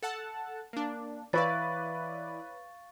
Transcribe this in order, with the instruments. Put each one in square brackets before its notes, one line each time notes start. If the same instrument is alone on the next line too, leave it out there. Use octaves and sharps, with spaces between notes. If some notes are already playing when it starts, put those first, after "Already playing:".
[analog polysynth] A4 F#5 A5
A#3 D4
[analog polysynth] E3 E4 D5 [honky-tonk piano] B4 C#5 [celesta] F5 C#6 A6